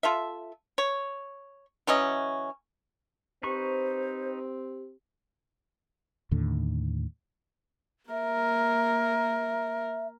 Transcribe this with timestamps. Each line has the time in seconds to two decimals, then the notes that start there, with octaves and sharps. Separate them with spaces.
0.03 F4 A4 E5
0.78 C#5
1.87 E3 F#3 C#4 D#5
3.43 C4 D#4 G4 B4 C5 C#6
6.31 D#2 A2 D3
8.10 A#3 A#4 E5